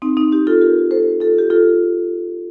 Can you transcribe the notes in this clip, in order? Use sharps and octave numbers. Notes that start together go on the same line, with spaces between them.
C4 D#4
C4 D#4
D#4 G4
F4 A4
G4 A#4
A4 C5
F4 A4
G4
F4 A4